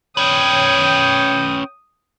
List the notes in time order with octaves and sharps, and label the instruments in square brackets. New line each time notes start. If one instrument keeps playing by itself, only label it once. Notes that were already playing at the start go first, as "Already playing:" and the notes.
[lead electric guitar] C#4 B4 [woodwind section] C#5 G5 [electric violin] D#6